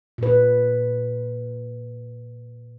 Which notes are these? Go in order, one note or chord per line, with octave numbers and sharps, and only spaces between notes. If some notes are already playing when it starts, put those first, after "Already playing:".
A#2 B4